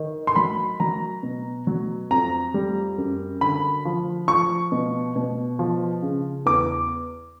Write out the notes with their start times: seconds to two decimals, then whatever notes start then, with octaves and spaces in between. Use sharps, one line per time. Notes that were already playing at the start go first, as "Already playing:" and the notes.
Already playing: D#3
0.27 C6
0.36 F#3 B5
0.80 F#3 A#5
1.23 B2
1.67 F#3
2.11 F2 A#5
2.54 G3
2.98 F#2
3.41 D3 B5
3.85 F3
4.28 F3 C#6
4.72 B2
5.16 B2
5.59 F3
6.02 C#3
6.46 E2 D6